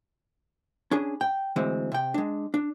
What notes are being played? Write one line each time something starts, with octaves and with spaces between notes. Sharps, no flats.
C#4 D4 G#4
G5
D2 E3 G#3 C4
C3 G5
G#3 D4
D4